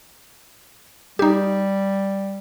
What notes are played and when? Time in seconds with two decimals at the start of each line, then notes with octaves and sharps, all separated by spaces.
1.19 G3 D#4 G4